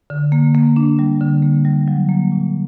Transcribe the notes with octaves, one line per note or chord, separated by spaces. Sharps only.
D3
A#3
A#3
D4
G3
D3
A#3
G3
F#3
A#3
A#2